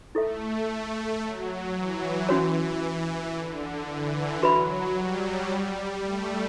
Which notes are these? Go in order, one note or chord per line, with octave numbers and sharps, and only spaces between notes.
A3 E4 A4 E5
A3
F#3
E3
C#4 F#4 C#5
D3
E3
F#3 F#4 B4 E5 B5
G3
A3